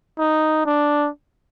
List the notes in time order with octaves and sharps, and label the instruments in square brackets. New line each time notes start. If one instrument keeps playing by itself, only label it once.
[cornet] D#4
D4